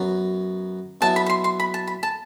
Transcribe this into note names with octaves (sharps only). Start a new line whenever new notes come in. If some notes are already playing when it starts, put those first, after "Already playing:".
Already playing: F#2 F#3 B3
B2 F#3 B3 E4 A5
B5
B5
C6
C6
B5
A5
B5
A5